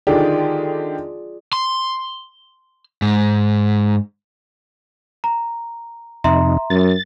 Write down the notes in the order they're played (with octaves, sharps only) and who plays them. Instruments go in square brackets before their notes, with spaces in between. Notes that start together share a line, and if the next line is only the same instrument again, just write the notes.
[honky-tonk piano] D3 D#3 G4 [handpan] F4 G#4 D5
[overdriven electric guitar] C6
G#2
[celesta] A#5
[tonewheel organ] F2 C3 D#4 [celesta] E5 A#5 C6
[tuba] F#2 [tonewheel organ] A6